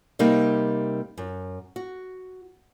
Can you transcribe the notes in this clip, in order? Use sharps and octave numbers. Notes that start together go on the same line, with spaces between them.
C3 G3 A#3 D#4
F#2
F#4